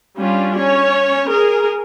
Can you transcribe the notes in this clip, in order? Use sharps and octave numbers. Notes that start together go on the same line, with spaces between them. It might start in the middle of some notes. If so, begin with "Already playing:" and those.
G3 C#4 D4 F4
C#4 C#5
G#4 A#4